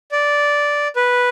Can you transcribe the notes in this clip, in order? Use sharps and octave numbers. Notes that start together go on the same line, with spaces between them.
D5
B4